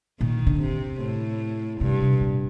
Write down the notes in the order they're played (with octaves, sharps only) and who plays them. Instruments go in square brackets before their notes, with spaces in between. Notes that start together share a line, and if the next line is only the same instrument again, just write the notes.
[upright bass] A#2 [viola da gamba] D#3
[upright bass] D3
[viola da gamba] C3
A2
[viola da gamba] G2 [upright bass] C3
[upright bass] C3
A#2